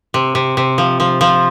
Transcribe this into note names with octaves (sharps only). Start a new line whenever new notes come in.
C3
C3
C3
F3
F3
F3